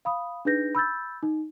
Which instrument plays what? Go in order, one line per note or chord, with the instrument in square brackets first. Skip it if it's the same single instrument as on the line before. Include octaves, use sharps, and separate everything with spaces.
[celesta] F5 B5 D#6
D4 D#4 G#4 B4 G6 A#6
B5 E6 G6 A6
D#4